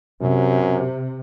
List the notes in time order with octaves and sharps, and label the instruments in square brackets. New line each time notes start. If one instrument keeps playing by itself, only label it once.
[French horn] F#2 [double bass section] C3